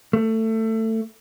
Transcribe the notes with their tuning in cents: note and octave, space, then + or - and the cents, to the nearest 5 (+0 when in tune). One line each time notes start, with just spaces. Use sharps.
A3 +20